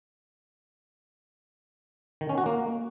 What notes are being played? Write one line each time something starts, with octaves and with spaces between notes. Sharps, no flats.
D#3
C#4
F#4
A#3